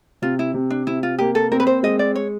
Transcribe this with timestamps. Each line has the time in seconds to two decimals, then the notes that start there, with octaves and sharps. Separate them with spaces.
0.22 C3 F4
0.39 E4
0.54 C3
0.70 D4
0.87 C3 E4
1.03 F4
1.19 A#3 G4
1.35 A4
1.52 C4 A#4
1.60 B4
1.67 C5
1.83 G#3 D#5
1.99 D5
2.16 C#5